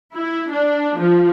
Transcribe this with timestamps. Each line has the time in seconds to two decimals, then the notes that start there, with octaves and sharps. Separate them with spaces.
0.16 E4
0.51 D4
0.99 F3